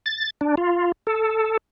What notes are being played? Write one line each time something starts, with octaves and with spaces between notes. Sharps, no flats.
A6
D4
F4
A4